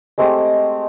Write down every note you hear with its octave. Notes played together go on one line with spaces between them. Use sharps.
G#3 A3 C4 G4